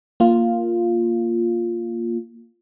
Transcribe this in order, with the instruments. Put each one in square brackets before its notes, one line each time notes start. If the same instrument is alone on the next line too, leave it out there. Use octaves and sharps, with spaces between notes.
[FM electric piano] A#3 F4